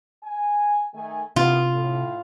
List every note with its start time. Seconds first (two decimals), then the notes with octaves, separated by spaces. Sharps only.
0.23 G#5
0.94 D#3 A3 G#5
1.36 C3 D#3 B3 E4 F4
1.72 A2